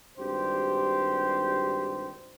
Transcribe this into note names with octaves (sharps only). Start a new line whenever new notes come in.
G#1 G2 G4 C5